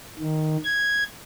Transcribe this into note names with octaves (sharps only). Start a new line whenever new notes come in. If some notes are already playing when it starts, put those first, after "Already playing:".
D#3
G#6